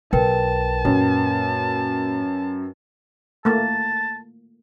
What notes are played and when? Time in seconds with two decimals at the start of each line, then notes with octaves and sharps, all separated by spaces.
0.13 B1 A#4 B4 G5 A5
0.85 F#2 A#2
3.45 A3 A#3 A5